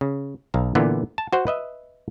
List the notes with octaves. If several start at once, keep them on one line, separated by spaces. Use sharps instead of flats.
C#3
B1 F5 A#5
A#2 D3 E3 B3
A5
F#4 C5 F#5
B4 D#5 E5